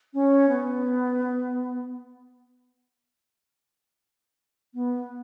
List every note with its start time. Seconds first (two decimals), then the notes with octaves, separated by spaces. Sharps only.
0.14 C#4
0.49 B3
4.74 B3